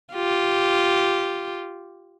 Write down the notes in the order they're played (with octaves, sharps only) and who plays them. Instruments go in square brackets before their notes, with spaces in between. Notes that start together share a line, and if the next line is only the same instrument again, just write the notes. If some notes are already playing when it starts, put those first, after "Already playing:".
[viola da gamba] F4 G4